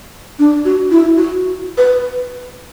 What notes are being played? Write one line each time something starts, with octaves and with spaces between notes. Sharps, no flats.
D4
F#4
E4
F#4
B4